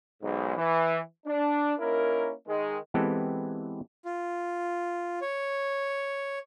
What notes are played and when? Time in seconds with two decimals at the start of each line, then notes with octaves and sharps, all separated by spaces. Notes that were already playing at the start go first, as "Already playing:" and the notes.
0.22 B1 G#2
0.56 E3
1.27 D4
1.80 A#3 C#4 D#4 E4 A#4
2.47 D#3 G#3
2.94 E3 G#3 B3 C4 G4 A4
4.05 F4
5.22 C#5